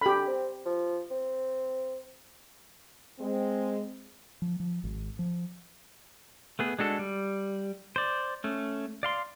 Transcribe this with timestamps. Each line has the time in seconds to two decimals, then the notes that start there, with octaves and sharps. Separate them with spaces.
0.01 D3 G4 B5
0.28 C4
0.65 F3
1.11 C4
3.19 G#3 C4
4.42 F3
4.60 F3
4.84 G#1
5.19 F3
6.59 A3 B3 G#4
6.79 G#3 D4 F#4 A4
6.99 G3
7.96 C5 D5
8.44 A3 C#4
9.03 D5 F5 C6